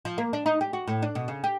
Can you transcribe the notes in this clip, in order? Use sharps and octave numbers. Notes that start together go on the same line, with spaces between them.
F3
A#3
D4
D#4
G4
F#4
A2
D4
B2
C#3
G4